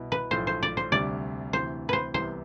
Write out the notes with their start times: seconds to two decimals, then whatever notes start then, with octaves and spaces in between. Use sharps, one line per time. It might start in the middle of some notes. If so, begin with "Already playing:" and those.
Already playing: C2 B2 B3 E4
0.12 B4
0.31 B1 A2 F3 A3 C5
0.47 C5
0.63 D5
0.77 C5
0.92 D2 C3 G3 D4 D5
1.53 D2 C3 E3 C5
1.89 B4 C5
2.14 C2 C3 E3 B3 C5